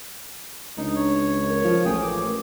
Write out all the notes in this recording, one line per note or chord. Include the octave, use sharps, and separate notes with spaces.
C#2 D4 D#4
C#5
A#4
F3
A1 G#4 G5 D#6
D6